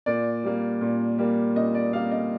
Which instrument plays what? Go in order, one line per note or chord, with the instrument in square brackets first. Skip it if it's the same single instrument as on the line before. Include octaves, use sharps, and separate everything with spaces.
[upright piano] A#2 D5
G3 A#3
A#2
G3 A#3
A#2 D#5
D5
G3 A#3 F5
D#5